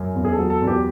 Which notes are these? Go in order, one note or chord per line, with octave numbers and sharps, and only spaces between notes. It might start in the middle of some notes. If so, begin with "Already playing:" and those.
Already playing: F#2
E2
G#4
A4
F#3
A4
E2
G4